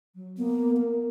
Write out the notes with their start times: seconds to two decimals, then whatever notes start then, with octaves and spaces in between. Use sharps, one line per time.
0.15 F#3
0.37 A#3 B3
0.77 A#4